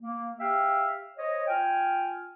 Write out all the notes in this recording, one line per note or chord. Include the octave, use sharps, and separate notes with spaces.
A#3
G4 E5 F5 G5
C5 C#5 D#5
F4 G5 G#5 F6